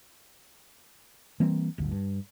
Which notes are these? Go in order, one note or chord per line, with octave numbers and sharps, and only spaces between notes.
E3 G3 A#3 C4
D1 G1 D2
G2